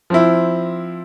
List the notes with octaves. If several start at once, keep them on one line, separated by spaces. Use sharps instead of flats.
F3 C4 E4